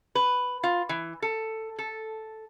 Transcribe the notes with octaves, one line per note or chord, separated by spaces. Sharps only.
B4
F4
E3
A4
A4